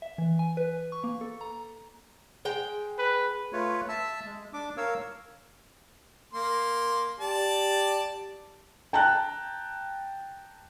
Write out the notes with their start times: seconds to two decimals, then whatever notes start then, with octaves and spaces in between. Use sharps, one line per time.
0.02 E5
0.18 E3
0.39 G#5
0.57 B4
0.92 C#6
1.04 A#3
1.21 A4
1.41 A#5
2.45 G#3 G5
2.99 B4
3.53 A3 F4 B4 C#5
3.88 E5 A5 E6
4.25 G#3
4.53 D4 D6
4.77 A#4 C#5 F5 E6
6.33 A#3 C6
7.20 G4 D5 A5
8.93 G5 A5 A#5 F#6